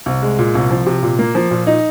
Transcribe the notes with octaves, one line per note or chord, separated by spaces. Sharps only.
C2
G#3
A#2
C2
F3
C3
A#2
A#3
F3
A#2
D#4